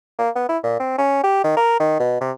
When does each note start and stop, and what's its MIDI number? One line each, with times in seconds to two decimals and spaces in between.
0.18 0.30 58
0.36 0.44 59
0.49 0.58 64
0.63 0.79 46
0.80 0.93 60
0.98 1.20 61
1.24 1.43 67
1.44 1.53 51
1.57 1.77 70
1.80 1.99 51
1.99 2.18 47
2.21 2.32 48